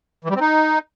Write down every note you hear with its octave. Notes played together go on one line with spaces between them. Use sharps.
E3
G3
C4
D#4